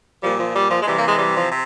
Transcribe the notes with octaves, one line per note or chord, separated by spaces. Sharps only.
A#2 F3 G3
F3
G3
F3
G#3
C3 E3 G3
A#3
G#3
G3
F3
C3